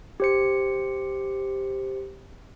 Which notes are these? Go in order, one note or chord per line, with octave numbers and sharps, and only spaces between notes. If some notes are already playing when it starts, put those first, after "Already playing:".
G4 C5 C#7